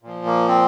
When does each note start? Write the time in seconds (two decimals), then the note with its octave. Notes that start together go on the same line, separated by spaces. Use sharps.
0.03 A#2 F3
0.26 A#3
0.48 C4